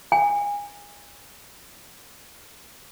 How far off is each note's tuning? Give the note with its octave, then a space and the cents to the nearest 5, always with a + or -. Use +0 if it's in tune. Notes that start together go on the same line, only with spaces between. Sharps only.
G#5 -25